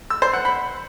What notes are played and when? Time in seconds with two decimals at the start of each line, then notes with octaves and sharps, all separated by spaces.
0.10 E6
0.22 C5
0.33 F#5
0.45 B5